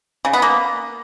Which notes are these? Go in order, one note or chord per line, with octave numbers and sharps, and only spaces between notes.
C#3
B3
A#3